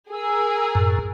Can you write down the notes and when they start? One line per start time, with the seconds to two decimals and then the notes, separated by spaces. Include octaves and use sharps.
0.12 G#4 A#4 E6
0.75 F#2 A2